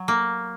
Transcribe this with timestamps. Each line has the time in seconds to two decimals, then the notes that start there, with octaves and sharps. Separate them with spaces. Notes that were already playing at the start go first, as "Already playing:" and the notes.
Already playing: F#3
0.08 A#3